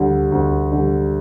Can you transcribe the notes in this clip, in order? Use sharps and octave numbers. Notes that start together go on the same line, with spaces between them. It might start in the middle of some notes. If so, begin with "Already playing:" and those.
Already playing: D2 D3 G3
D2
D3 G3